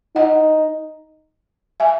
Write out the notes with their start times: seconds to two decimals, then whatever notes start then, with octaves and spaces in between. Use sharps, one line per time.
0.16 D#4 D#5 F#5
1.80 E5 G#5